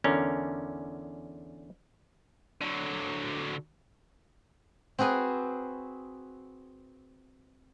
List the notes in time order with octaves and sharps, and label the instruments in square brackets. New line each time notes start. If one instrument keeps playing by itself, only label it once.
[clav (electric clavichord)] E2 D3 C#4 A#4
[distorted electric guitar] D3 F#3
[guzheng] C4 F#4 G#4 B4 G#5